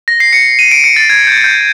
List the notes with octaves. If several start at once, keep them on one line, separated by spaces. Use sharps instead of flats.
A#6
C7
C#7
D#7
D7
C#7
A6
G#6
G6
G6